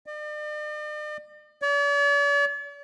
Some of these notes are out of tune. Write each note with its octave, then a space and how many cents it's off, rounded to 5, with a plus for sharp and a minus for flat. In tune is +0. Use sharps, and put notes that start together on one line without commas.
D5 +45
D5 -45